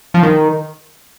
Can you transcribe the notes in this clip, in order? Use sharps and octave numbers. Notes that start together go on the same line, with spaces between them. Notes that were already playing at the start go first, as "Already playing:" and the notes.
F3
D#3